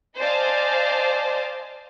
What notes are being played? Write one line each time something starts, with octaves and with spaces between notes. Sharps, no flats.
C5 D5 D#5 F5 G#5 A5